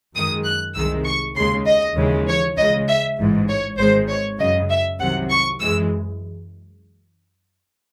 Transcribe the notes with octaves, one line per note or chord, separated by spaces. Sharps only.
F#2 D#3 G#3 D#6
F#6
C2 C3 D#3 G#3 E6
C#6
D#2 C#3 G#3 C6
D#5
D#2 C#3 E3 G#3
C#5
C#2 C#3 G#3 D#5
E5
A1 G#2 E3
C#5
G#1 G#2 D#3 G#3 C5
C#5
F#2 C#3 F#3 D#5
E5
C2 C3 D#3 F#3 F#5
C#6
F#2 E3 G#3 E6